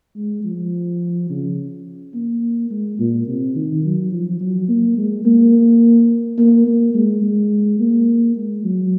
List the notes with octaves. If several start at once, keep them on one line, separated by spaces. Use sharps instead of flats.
G#3
F3
C#3
A#3
G#3
A#2
C3
D#3
F#3
F3
F#3
A#3
G#3
A#3
A#3
A#3
G#3
G#3
A#3
G#3
F#3